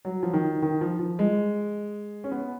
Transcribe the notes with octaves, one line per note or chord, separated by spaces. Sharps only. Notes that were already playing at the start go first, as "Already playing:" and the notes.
F#3
F3
D#3
D#3
F3
F3
G#3
C#4
B3